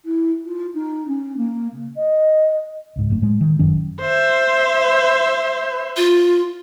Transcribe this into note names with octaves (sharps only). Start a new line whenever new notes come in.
E4
F4
D#4
C#4
A#3
C#3
D#5
C#2 G#2
F#1 G2 A3
A2 G#3
D#3
G1 F#2 D#3 C#4
C5 E5
F4